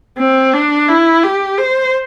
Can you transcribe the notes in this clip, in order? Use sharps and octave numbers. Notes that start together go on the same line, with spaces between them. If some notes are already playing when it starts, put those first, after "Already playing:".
C4
D4
E4
G4
C5